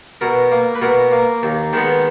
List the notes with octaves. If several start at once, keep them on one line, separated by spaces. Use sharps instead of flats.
B2 A#4
A#3
B4
B2 A#4
A#3
D#2
D#3 G#3 B3